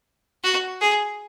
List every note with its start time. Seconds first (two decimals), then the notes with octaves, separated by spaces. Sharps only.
0.44 F#4
0.81 G#4